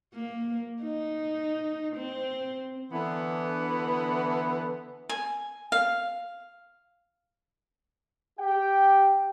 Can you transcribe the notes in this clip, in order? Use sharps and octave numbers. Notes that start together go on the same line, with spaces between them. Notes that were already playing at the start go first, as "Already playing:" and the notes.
A#3
D#4
C4
D3 E3 B3
G#5
F5
G4 G5